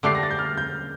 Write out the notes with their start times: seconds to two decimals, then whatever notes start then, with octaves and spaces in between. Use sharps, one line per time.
0.03 D3 A3 D4 G4 C7
0.15 A#6
0.23 A6
0.31 G6
0.39 F6
0.57 G6